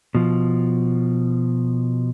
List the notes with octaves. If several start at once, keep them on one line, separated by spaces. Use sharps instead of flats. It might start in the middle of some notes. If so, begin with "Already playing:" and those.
B2 F3